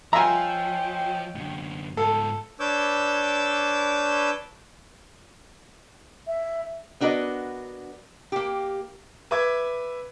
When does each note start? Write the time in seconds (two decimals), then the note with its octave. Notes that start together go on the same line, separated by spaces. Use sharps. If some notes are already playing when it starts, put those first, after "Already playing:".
0.13 F3 F4 C#5 D#5 E5 G5 G#5 A#5
1.35 F#2 D3
1.97 G#2 F4 A4
2.60 D4 B4 C#5 D6 E6 G6
6.27 E5
7.00 B3 D4 F#4 A#4 D#5
8.32 A#3 G4
9.31 B4 E5 D6 G#6